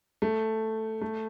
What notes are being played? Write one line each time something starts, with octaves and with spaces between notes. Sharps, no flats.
A3
A3